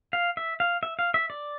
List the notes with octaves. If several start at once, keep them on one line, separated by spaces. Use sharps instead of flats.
F5
E5
F5
E5
F5
E5
D5